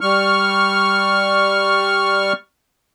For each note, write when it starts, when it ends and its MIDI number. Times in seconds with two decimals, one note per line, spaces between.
0.01 2.33 55
0.01 2.33 85
0.01 2.33 89